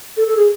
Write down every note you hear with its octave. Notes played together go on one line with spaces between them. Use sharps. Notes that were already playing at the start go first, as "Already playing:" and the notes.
A4
A4
G#4